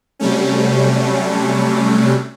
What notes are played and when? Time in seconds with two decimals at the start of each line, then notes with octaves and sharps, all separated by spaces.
0.19 C3 F#3 G3 A3 C#4